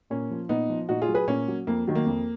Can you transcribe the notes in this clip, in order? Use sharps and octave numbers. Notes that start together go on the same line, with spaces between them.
A#2 A#3 C#4
F3
A#2 B3 D#4
F3
A#2 D#4 F#4
F4 G#4
F#3
G#4 B4
A#2 A#3 C#4
F#3
F2 A#3
D#3 F#3
A#3
F2